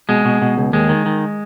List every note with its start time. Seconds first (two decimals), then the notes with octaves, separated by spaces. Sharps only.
0.09 B2 G#3
0.25 B2
0.42 B2
0.58 C#2
0.73 D#2 G#3
0.89 D#3
1.06 D#3